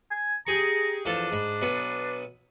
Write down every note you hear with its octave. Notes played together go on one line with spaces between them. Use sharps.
G#5
G4 G#4 A#5 C#6
E2 F3 D4 A4
G#2 B5
B1 B3 B5